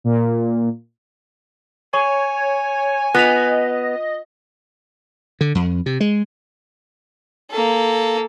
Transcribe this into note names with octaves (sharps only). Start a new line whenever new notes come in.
A#2
C#5 G#5 C#6
B3 F4 D#5 B6 F7
D3
F2
C3
G#3
A#3 A4